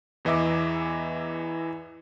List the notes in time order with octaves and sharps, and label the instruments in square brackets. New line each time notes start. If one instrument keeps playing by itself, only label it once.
[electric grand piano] E2 E3 D#5 E5 D6